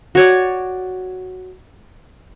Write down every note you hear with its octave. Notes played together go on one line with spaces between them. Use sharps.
F#4 C#5 D5